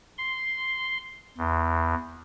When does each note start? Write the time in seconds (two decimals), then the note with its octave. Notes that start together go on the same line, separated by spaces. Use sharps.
0.18 C6
1.38 E2